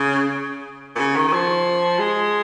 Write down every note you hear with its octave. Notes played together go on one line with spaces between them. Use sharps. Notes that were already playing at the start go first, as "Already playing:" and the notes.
Already playing: C#3
A#2
C#3
D#3
D#3
F3
G#3